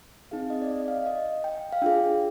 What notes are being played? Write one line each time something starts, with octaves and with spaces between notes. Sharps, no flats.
C4 D#4 G#4 F5
D#5
D5
D#5
D#5
F5
D#5
G5
F5
D4 F4 G#4 G5